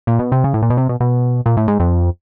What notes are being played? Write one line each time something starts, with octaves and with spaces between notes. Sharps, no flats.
A#2
B2
C3
C#3
A2
A#2
B2
C3
B2
B2
A#2
A2
G#2
F2